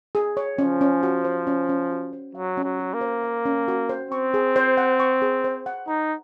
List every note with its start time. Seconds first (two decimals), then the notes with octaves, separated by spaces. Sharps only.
0.15 G#4
0.37 C#5
0.59 F3 C#4
0.81 C#4
1.03 F#4
1.25 C5
1.47 C#4
1.69 C#4
1.91 F#4
2.13 C5
2.35 F#3 F5
2.57 C#4
2.64 F#3
2.79 F#4
2.94 A#3
3.01 C5
3.23 F5
3.45 C#4
3.68 F#4
3.89 C5
4.11 C4 C#6
4.34 G#4
4.56 C5
4.77 F#5
5.00 C#6
5.22 G#4
5.44 C5
5.66 F#5
5.88 D#4 A#5